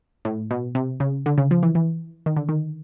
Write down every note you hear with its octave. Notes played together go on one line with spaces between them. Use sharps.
A2
B2
C3
C#3
D3
C#3
F3
E3
E3
D#3
D3
D#3